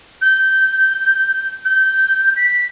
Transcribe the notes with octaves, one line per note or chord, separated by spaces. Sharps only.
G6
G6
B6